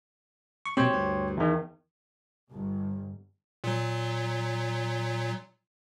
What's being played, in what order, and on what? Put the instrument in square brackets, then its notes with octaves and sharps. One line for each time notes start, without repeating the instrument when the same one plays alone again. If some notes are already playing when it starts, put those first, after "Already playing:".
[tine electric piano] C#6
[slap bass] B2 C4 [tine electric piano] G4 C5 C#5
[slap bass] D2 G2
[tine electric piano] E2 D#3
[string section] G1
[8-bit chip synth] A#2 F#3